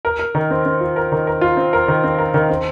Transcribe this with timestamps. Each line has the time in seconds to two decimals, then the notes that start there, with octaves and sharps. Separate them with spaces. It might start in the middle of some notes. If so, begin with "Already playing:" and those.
0.05 A#4
0.19 A#4
0.35 D#3
0.50 C4
0.65 C4
0.81 F4
0.96 A#4
1.12 D#3
1.27 A#4
1.41 F4
1.57 C4
1.73 A#4
1.88 D#3
2.04 C4
2.18 A#4
2.34 D#3
2.49 C4